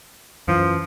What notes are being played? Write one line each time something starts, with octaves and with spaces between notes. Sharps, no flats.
F#2 E3 F3